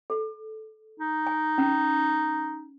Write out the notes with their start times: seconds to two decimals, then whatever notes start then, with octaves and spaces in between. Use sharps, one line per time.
0.10 A4
1.00 D#4
1.27 G#5
1.58 C#4